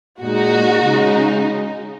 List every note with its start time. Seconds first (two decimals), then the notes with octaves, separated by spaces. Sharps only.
0.22 A#2 G#3 D#4 F#4
0.84 C#3 G#3 D#4